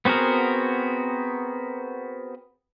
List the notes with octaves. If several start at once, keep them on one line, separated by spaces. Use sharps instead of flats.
B3 C4 F#4 G#4 A#4